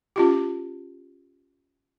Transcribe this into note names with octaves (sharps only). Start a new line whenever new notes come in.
C#4 F4 G4